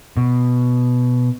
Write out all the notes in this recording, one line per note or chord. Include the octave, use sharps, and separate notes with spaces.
B2